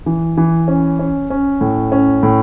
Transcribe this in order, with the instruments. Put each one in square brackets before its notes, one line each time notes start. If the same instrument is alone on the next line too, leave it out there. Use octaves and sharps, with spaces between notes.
[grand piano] E3
E3
C#4
C#4
C#4
A2
C#4
A2